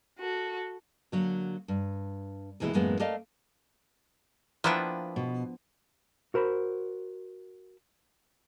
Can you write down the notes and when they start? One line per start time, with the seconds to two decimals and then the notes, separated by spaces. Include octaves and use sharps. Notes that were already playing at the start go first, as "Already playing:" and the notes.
0.19 F#4 A4
1.12 D3 F#3 A#3
1.68 G2
2.60 D#2 B2 E3 G#3 E4
2.73 F#2 A2 E3 G#3 A#3 B3
3.00 A3 A#4 D5 D#5 F5
4.64 F3 A#3 B3 D4 E4 G5
5.16 B2
6.34 F#4 A#4 C5 B5